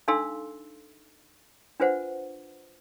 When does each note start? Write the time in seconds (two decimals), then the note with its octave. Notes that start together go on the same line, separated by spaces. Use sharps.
0.08 D4 D#4 A4 F5 C6 E6
1.80 D4 F4 B4 C5 F#5